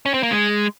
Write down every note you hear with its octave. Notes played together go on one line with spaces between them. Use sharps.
C#4
C4
A#3
G#3